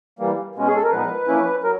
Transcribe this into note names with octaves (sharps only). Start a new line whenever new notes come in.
E3 G3 A#3
B2 G#3 C#4
G#4
A4
A#4
A#2 F3 G#3 B3 D#4 B4
F3 A#3 C#4 E4
F#3 A#4